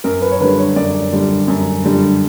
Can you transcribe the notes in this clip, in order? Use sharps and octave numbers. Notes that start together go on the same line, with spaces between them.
F#2 A#4
B4
C#5
D3 G3 B4
C#5
F#2 D5
D3 G3
F#2
D3 G3